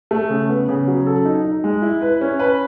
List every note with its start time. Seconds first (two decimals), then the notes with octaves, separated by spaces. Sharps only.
0.11 A3
0.30 C#3
0.49 B3
0.69 C#3
0.87 F#3
1.07 A4
1.25 D#4
1.45 D#4
1.64 G#3
1.82 E4
2.02 B4
2.21 C#4
2.39 B4